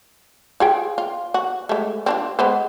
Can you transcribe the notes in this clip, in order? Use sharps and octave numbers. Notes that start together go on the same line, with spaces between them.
F4 G#4 G5
F4
F#4
G#3 A3
C4 D4 F4
G#3 B3 C5